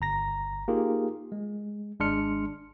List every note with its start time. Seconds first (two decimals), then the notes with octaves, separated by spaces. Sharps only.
0.01 G1 A#5 A#6
0.68 A#3 D#4 F4 G4 G#4 A#4
1.32 G#3
2.00 G#1 G#3 D4 C6 F6 C#7